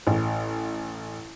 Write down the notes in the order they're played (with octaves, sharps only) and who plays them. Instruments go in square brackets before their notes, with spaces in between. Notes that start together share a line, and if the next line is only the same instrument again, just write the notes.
[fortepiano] A1